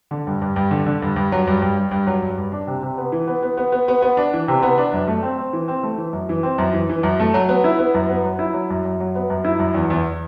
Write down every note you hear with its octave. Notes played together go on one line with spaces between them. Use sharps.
D3
G2
G2
G2
D3
D3
G2
G2
F#3
G2
G2
G2
G2
F#3
G2
G2
D4
C3
C3
B3
E3
B3
B3
B3
B3
B3
B3
D4
E3
C3
B3
D4
F#2
A3
C4
C4
E3
C4
A3
E3
F#2
E3
C4
F#2
E3
E3
F#2
A3
F#3
B3
E4
B3
F#2
B3
F#3
E4
F#3
F#2
F#2
F#3
B3
F#2
E4
F#2
E2
E2